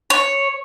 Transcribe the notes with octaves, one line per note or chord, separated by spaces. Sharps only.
C#5